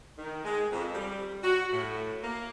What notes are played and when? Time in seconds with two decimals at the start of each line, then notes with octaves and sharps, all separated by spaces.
0.18 D#3
0.45 G#3
0.73 F2
0.95 G3
1.43 F#4
1.73 A2
2.23 A#3